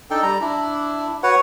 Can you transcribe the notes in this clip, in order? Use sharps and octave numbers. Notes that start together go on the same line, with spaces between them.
D4 D#4 A4 G5
G3 A#5
D4 E4
F#4 B4 C#5 F#5